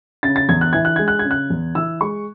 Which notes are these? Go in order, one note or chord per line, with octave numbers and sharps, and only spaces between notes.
C#3 A6
A6
E2 G#6
F#6
E3 G#6
F#6
G#3 G#6
F#6
G#6
C#3
F#6
E2
E3 E6
G#3 C#6